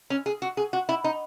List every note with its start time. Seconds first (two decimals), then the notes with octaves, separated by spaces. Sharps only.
0.10 C#4
0.26 G#4
0.42 F#4
0.57 G#4
0.73 F#4
0.89 E4
1.04 D#4